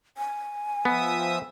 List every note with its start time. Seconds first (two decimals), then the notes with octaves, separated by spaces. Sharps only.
0.18 G#5
0.85 F3 B3 E5 D#6